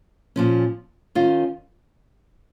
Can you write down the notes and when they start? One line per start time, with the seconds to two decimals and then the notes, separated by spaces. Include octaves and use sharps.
0.36 A#2 F3 C#4
1.15 D#3 C#4 F4